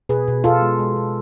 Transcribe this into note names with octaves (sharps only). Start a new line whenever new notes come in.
B2 G#4 B4
B2
B2 F4 A4
G#3
G#3
B2